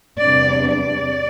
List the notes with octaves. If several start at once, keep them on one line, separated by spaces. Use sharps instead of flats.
E2 C3 G3 B3 D4 D5
D5